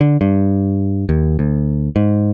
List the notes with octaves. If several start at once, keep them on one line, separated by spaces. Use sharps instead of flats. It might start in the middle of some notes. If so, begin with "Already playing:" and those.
D3
G2
D#2
D2
G#2